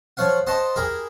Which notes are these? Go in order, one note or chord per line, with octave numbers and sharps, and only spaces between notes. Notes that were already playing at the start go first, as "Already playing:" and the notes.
F3 C#5 F5 F#5
C5 D#5 F#5 A5 C6
E4 G4 G#4 A#4